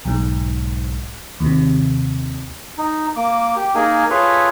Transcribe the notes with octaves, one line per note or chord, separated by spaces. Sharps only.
B1 G#2
D#2 C3
D#4
A#3 D6
G4
A#3 D#4 G#4 A#4 G#5
F4 G#4 A4 B4 C#5 E5